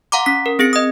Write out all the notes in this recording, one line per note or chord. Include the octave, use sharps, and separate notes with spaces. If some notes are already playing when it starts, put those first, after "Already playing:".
F5 F#5 A#5 C6 D6
C#4 B6
A#4
C4 G#4 A#6 C#7
D#5 D#6